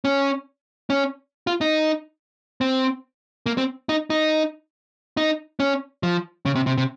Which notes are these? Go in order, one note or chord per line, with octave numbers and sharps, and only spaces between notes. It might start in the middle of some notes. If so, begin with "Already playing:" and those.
C#4
C#4
F4
D#4
C4
A#3
C4
D#4
D#4
D#4
C#4
F3
C#3
C3
C3
C3